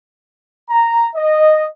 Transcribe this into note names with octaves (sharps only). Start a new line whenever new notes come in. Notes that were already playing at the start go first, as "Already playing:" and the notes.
A#5
D#5